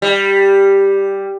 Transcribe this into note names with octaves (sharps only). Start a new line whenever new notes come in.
G3